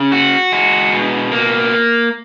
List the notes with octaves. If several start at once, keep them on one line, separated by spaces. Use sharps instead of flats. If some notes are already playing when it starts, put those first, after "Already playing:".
Already playing: C#3
F#4
G#3
B2
A#3